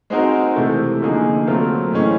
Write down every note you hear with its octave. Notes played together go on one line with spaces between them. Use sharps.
G#3 C4 D#4 F#4 A#4
C3 E3 A3
D3 F3 A#3 D#4 G#4
F#3 A3 C4 F4 A#4
A2 E3 G#3 C#4